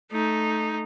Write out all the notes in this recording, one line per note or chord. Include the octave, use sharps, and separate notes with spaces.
A3 D#4